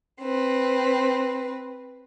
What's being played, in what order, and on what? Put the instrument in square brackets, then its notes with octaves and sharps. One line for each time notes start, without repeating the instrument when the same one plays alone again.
[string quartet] C4 B4